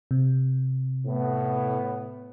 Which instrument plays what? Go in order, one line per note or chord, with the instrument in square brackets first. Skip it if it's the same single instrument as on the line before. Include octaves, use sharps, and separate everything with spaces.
[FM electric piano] C3
[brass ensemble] A2 B3